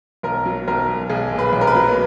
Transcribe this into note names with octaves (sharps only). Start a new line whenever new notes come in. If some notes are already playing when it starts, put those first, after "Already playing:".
B1 A#4
F#3
B1 A#4
B1
B1 G#4
A#2
B4
B1
A#4
B4
F#3